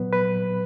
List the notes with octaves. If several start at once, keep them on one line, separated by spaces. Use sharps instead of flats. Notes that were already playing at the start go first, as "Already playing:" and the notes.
Already playing: A#2 F#3 B3 B4
B4